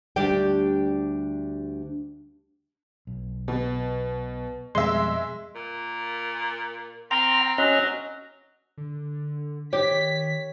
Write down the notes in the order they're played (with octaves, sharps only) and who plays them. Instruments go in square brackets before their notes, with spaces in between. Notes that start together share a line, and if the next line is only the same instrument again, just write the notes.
[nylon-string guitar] D2 G3 D4 G4 D5 G5
[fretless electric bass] B1
[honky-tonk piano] B2
[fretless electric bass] F2 B2 G3 [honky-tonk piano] G#3 E5 [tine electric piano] C6
[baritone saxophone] A#2
[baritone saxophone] C4 [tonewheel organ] G5 A#5 F6
[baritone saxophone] F#3 [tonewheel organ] C#4 D#5 F6
[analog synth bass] D3
[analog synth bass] D#3 [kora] G4 [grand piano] C#5 [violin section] B6